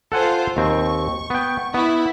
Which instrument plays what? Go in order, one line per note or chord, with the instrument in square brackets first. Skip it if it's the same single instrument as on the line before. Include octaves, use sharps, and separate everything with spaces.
[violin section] F4 C5 [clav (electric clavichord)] A4 F#5 G#5
[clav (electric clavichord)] D#2 C4 [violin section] C#6
[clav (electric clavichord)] B3 G5
[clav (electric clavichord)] B3 [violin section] E4